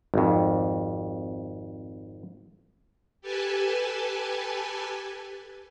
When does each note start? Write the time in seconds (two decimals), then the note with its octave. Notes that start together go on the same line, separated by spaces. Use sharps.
0.14 G#1 F2
3.21 G4 A4 B4 G#5 A5